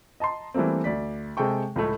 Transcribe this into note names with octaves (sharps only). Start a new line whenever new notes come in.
D#5 A5 A#5 C6
E3 G3 A3 A#3 C4
D2 D5 B6
C3 G#3 A4 G5 C#6
C#2 A2 A3